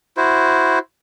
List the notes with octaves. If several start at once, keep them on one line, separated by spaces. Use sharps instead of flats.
E4 F#4 C5